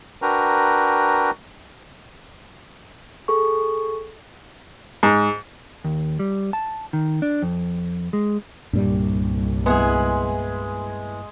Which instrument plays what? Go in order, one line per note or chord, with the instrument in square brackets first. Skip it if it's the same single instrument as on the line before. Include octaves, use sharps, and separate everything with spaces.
[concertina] D4 F#4 A#4 B4 G5 A#5
[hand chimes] G#4 A4 C#6
[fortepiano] G#2
[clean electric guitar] D#2
G3
A5
D#3
D4
F2
G#3
[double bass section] C2 [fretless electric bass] G2 A#2 G3
[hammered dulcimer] G#3 [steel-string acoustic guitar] B3 E4 G#4